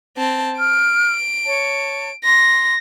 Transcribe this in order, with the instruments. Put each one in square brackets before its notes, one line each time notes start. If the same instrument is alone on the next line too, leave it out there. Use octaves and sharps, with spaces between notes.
[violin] C4 A5
[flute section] F6 [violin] D7
[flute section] C#5 A5
[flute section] C6 [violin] A#6